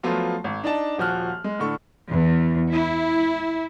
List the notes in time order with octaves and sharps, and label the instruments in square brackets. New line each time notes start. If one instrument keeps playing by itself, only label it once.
[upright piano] F3 F#3 A3 B3 F4
G#1
D4 D#4 D5 A5
D#1 F3 F#4 F6 F#6
G#3
A2 D3 A4 C#6
[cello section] E2
E4